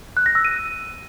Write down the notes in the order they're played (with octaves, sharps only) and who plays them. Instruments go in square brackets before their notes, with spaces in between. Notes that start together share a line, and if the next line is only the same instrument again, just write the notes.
[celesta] F#6
A#6
E6
D#7